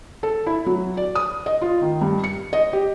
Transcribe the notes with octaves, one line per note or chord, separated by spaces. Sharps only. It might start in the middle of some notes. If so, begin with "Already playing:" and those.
A4
E4
F#3
D5
D#6
D#5
F4
D#3
G2
C#7
D#5
G4